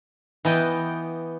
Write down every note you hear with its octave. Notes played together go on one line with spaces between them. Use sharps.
E3 B3 D#5 G5